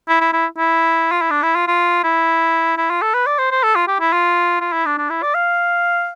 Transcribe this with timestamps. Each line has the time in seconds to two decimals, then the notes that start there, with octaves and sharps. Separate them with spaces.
0.08 E4
0.21 E4
0.33 E4
0.58 E4
1.12 F4
1.21 E4
1.31 D4
1.43 E4
1.55 F4
1.67 F4
2.04 E4
2.77 E4
2.90 F4
3.02 A4
3.14 B4
3.27 D5
3.39 C5
3.51 C5
3.63 A4
3.76 F4
3.87 G4
4.00 E4
4.13 F4
4.61 F4
4.73 E4
4.86 D4
4.97 D4
5.10 E4
5.22 D5
5.35 F5